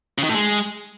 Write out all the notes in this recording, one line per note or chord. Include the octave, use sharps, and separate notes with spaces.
C#3
D#3
A2
G#3